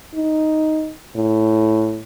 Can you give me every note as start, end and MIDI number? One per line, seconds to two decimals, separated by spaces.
0.15 0.92 63
1.16 2.01 45